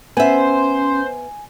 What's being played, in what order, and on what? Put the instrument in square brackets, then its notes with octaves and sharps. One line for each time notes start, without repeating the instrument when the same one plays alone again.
[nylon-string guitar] B3 E5 [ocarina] C#4 [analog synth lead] C5 [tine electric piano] G#5